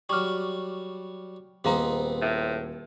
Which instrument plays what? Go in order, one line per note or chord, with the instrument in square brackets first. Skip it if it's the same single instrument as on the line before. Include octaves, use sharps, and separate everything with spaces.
[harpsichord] F#3 G3 [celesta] C#6 D6 F6
[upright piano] D#1 [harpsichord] B3 C4 D#4 [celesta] G#4 F5 A#5
[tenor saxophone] A2